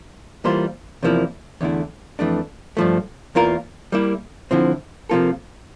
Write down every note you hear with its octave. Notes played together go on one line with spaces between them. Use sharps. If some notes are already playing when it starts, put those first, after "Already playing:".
E3 G3 A#3 F4 C5
E2 C3 F3 A#3 E4
E2 D3 A3 E4
F2 E3 A3 D4
G2 F3 A3
E2 E3 A#3 F4 A#4
G3 A#3 E4
D3 F3 C4 E4
C3 F3 A#3 F4 A4